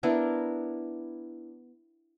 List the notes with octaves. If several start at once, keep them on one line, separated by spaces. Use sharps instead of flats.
B3 D4 E4 A#4